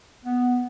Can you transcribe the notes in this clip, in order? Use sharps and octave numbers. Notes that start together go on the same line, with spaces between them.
B3